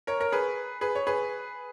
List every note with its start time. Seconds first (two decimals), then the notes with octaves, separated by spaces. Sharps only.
0.07 A#4 C#5
0.20 A#4 C#5
0.32 G#4 B4
0.81 G#4 B4
0.95 C#5
1.07 G#4 B4